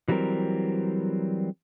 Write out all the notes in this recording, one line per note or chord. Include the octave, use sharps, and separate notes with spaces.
E3 F#3 G3 C4 A#4